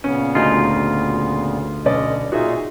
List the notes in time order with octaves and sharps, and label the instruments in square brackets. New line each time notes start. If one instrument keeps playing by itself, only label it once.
[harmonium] A#2 C#3 B3 [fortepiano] C#4
[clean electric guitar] D2 F4 [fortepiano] D#4 F#4 G#5
[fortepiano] B1 C#4 D5 [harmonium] D#5
[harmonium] A#2 D#4 F4 [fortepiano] F#4 G#4 E5